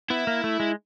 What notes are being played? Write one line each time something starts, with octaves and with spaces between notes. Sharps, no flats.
B3 E4
A#3
A3
G#3